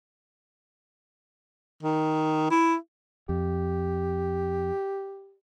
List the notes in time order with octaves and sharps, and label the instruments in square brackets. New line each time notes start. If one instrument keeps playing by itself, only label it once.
[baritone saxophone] D#3
E4
[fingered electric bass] F2 [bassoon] G4